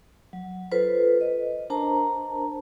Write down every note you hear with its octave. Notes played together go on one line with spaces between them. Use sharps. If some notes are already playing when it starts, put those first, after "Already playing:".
F#3
F4 A4 B4 C5
D#5
D4 A#4 C5 A5 A#5